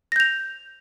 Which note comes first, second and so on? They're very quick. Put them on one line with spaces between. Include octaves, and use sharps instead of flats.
A#6 G6 F7